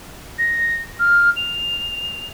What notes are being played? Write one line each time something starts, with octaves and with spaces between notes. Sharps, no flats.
A#6
F6
F7